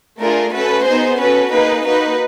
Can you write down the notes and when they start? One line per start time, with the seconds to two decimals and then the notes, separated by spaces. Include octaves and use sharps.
0.20 A3 D4 F4 G#4 A#4
0.53 A3 C#4 F#4 A4 B4
0.85 B3 D#4 G#4 C5
1.19 C#4 F#4 A4 B4
1.51 A#3 D#4 G#4 B4
1.84 A#3 D#4 F#4 B4